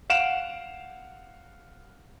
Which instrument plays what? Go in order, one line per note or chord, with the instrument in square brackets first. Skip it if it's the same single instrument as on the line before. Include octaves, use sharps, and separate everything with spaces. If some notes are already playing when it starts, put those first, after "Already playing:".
[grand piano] F5 F#5 D7 E7 F7